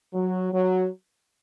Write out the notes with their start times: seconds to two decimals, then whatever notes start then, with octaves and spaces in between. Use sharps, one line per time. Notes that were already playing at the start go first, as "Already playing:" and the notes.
0.14 F#3
0.52 F#3